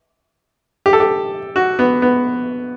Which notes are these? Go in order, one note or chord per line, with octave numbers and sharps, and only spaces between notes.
G4
A4
G4
F#4
B3
B3